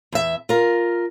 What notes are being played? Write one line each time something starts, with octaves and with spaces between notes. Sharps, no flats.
E2 E5
F4 A#4